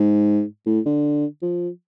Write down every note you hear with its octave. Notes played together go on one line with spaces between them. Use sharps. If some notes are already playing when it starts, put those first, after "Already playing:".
Already playing: G#2
A2
D3
F3